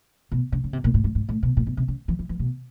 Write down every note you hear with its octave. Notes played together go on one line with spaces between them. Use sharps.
B2
C#3
C#3
C3
A#2
A2
G#2
G#2
A2
B2
A#2
B2
C3
C#3
E3
E3
E3
B2